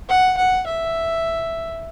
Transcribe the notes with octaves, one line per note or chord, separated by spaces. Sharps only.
F#5
F#5
E5